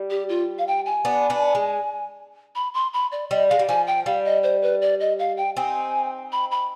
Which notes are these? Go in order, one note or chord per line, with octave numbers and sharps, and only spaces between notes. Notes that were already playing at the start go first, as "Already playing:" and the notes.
Already playing: G3
G4
F4
F5
G5
G#5
B3 D4
B3 D4
G#3
B5
C6
B5
D5
G3 D#5
G#3 F5
G3
F3 G#5
G5
G3 F5
D#5
C5
B4
D5
D#5
F5
G5
C4 D#4 G#5
B5
B5